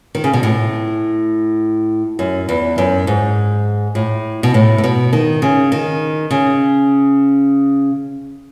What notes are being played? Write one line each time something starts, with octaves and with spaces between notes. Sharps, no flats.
D#3
C#3
B2
A2
F#2
E2
F#2
G#2
A2
B2
A2
A2
B2
D#3
C#3
D#3
C#3